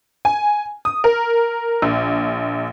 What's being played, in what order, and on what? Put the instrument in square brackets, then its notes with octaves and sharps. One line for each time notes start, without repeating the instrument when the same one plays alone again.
[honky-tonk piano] G#5
D#6
A#4
A#1